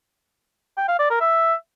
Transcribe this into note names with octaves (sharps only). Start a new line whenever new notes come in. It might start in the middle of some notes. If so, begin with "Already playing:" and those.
G5
F5
D5
A#4
E5